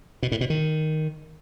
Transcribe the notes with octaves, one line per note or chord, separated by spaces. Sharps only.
B2
A2
B2
D#3